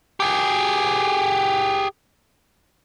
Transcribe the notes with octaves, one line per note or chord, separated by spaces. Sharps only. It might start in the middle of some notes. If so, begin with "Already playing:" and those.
G4 G#4